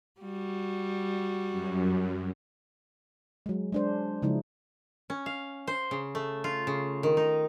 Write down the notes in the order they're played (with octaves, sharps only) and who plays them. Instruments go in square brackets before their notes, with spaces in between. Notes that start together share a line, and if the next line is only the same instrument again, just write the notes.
[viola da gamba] G3 F#4
[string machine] F#2
[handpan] F#3 G#3
G#3 D4 C5
C#3 F3 G#3 D#4 E4
[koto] C#4
F5
C5
C#3
A3
F4
C#3
D#3
D#4